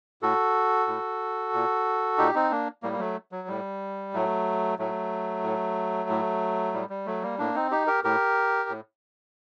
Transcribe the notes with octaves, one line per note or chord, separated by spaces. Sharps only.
A2 F#4 A4
A2
A#2
A#2 D#4 G4
C4 D#4
A#3 D4
A2 G3 A#3
A#3
F#3 A3
F#3
A2 G3
A2 F#3 A3
A2 F#3 A3
A2
A2
A2 G3
G3
F#3 A3
G3 A#3
A2 A#3 D4
C4 D#4
D#4 G4
G4 A#4
A2 G4 A#4
A2